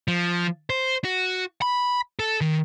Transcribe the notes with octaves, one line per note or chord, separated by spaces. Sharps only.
F3
C5
F#4
B5
A4
D#3